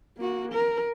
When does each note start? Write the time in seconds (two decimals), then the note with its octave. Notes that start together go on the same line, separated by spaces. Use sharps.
0.17 A#3 F#4
0.52 A#4